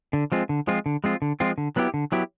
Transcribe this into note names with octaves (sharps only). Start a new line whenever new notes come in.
D3
F3 G#3 C4 F4
D3
F3 G#3 C4 F4
D3
F3 G#3 C4 F4
D3
F3 G#3 C4 F4
D3
F#3 B3 E4 G4
D3
F#3 B3 E4 G4